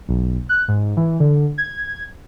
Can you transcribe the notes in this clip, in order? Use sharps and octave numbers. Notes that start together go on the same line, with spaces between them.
B1
F#6
G#2
E3
D3
G#6